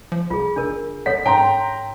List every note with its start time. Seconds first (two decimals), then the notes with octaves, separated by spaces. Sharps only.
0.12 F3
0.30 C2 F4 G#4
0.56 F#1 D4 A#4
1.06 E1 A4 C#5 F#5 B6
1.26 G#2 C#5 G5 A#5 C6